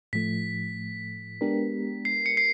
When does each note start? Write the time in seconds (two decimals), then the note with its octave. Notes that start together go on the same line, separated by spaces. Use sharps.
0.13 A2 F3 A3 B6
1.41 G#3 B3 D4 G4 A#4
2.05 C7
2.26 C#7
2.37 C7